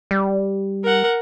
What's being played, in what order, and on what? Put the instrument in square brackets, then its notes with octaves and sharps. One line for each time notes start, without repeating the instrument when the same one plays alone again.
[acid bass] G3
[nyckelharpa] A#4 F#5